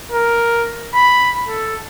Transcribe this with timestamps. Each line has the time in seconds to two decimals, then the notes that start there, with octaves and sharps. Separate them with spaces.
0.12 A#4
0.95 B5
1.48 A4